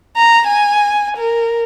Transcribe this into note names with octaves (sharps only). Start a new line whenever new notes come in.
A#5
G#5
A#4